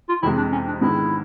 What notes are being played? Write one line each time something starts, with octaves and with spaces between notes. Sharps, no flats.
F4
F2 C3 E3 G#3 E4
D4
C#4
D4
G#2 D#3 G#3 B3 D4 E4